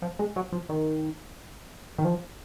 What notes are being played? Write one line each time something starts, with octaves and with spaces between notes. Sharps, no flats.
F3
G#3
F#3
F3
D#3
D#3
F3